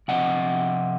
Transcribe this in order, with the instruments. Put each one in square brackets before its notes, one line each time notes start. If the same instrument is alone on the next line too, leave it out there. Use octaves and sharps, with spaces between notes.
[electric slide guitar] C3 F3 C4 D#5 F#5